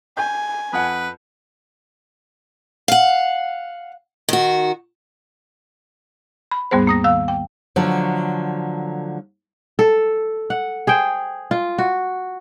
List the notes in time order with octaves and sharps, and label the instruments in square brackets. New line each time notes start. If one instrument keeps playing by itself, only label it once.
[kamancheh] G#5 [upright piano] G6
[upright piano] F2 F#5 [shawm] B4
[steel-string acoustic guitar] F5 F#5
D#3 F#4
[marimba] B5
D#2 G#2 G3 B3 G#4 C5
A#3 D#6 A#6
D#3 F5 E6
G5
[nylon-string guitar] D3 F3 F#3 A3
[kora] A4
F#5
G#4 C5 G5
F4
F#4